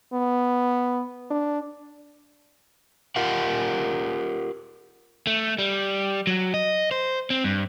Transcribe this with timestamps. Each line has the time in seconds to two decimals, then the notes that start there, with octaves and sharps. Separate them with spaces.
0.13 B3
1.31 D4
3.16 F4 G4 A#4 F#5
5.27 A3
5.58 G3
6.27 F#3
6.54 D#5
6.91 C5
7.30 C4
7.44 G2